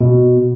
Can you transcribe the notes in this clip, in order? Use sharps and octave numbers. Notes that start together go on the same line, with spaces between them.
B2